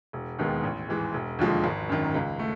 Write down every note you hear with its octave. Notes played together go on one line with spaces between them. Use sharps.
E1
D#2 D#3 G#3 B3
A1
G#2 E3 G#3
E1
D#2 D3 F3 G#3
G#1
F#2 D#3
C#2
A3